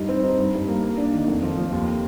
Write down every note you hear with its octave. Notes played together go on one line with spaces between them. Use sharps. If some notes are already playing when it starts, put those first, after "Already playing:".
Already playing: G2 D#4
C4
D#4
G2
G2
A#3
A#3
D4
D#3
F2
F3
F3
D#2